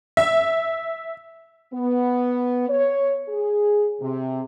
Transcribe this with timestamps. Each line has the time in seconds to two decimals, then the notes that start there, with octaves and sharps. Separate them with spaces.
0.17 E5
1.74 B3
2.69 C#5
3.29 G#4
4.02 C3